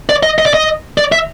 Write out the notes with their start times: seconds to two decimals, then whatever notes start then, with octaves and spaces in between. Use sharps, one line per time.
0.09 D5
0.23 D#5
0.38 D#5
0.46 D5
0.54 D#5
0.98 D5
1.12 E5